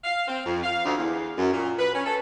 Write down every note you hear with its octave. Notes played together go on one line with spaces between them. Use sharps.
F5
C4
F2
F5
D2
E2
F#2
A#2
B4
C#4
A4